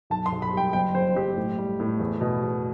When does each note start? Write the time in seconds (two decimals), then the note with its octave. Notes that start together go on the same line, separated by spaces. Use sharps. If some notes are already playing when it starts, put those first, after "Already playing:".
0.10 B1 A5
0.26 C6
0.32 B1
0.42 B5
0.52 G3
0.57 G5
0.73 F#1 G5
0.95 F#1 C5
1.15 F#1 G4
1.37 A2
1.58 G3
1.80 A2
2.00 E2
2.21 B2
2.42 E2